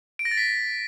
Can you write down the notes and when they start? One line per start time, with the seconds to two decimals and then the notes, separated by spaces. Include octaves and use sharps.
0.19 D7
0.25 A#6
0.31 A6
0.37 B6